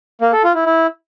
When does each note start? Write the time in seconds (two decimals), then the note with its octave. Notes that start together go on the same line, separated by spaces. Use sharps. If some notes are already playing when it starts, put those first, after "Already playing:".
0.21 A#3
0.33 A4
0.44 F4
0.55 E4
0.66 E4